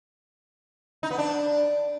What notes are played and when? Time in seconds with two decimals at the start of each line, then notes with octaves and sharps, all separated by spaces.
1.03 D#4
1.11 B3
1.18 D4